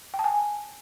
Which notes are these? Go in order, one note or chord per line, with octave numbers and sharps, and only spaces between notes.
G5
A5
G#5